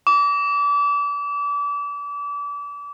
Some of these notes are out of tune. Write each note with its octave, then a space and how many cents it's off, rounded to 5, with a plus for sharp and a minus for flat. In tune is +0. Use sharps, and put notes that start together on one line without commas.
D6 -35